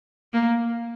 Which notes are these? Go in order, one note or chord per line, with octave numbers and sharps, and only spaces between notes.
A#3